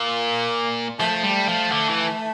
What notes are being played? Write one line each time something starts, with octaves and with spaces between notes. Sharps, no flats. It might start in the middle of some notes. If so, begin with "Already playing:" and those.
Already playing: A#2 A#3
F3 A3
G3
F3
D3
E3